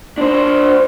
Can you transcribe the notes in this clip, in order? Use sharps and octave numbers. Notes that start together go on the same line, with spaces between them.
D4 C5